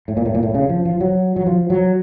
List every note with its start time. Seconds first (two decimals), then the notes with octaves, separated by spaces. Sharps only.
0.08 A2
0.17 A#2
0.26 A2
0.35 A#2
0.43 A2
0.54 C#3
0.69 F3
0.85 F3
1.01 F#3
1.36 F#3
1.47 F3
1.70 F#3